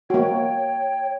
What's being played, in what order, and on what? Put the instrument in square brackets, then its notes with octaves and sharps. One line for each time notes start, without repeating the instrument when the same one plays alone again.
[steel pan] A#3 F#4 [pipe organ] C#5 G5